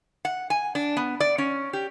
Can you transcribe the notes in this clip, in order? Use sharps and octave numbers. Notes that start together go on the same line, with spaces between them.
F#5
G#5
D4
B3
D5
C#4
G4